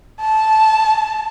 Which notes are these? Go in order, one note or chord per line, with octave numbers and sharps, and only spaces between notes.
A5